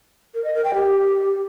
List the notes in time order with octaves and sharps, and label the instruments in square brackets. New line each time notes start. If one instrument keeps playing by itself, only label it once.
[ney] A#4
D#5
A#4
G5
G4